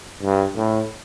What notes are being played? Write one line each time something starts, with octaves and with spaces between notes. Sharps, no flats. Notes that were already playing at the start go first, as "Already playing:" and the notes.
G2
A2